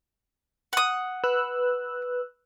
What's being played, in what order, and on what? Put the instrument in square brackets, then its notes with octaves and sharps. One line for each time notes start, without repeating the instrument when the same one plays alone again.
[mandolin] F#5 D#6
[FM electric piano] B4 E6 F#6